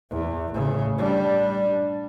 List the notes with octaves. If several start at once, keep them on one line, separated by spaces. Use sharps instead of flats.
E2
A1 C#3
G3 D4